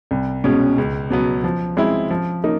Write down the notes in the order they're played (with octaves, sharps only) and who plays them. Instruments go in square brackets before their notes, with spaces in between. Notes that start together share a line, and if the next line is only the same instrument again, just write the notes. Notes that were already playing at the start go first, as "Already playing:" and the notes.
[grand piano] C2
B2 G#3 C#4
C#2
B2 F#3 B3
F3
G#3 C4 E4
F3
A#3 D#4